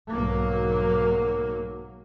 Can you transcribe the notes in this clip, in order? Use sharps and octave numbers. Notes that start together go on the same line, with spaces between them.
B1 G#2 F#3 A#3